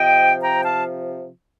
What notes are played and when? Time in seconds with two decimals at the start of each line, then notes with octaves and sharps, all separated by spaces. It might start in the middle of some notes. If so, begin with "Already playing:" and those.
Already playing: C3 F3 D#5 G5
0.42 G5 A#5
0.63 F5 A5